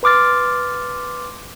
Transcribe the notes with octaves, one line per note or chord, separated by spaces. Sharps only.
B4 C6 D6 F6 A6